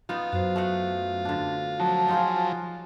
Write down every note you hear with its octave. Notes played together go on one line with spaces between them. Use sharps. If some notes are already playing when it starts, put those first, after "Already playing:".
B3 D#4 F4
F#2 F#4 C5
A3 D#5 F#5
D3 D4
F3 F#3 A5
D#4 F4 G#4